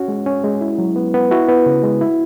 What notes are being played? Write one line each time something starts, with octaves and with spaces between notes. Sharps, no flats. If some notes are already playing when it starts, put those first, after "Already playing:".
Already playing: C#4 F#4
G#3
C#4
G#3
E4
F#3
B3
B3
E4 F#4
B3
C#3
G#3
E4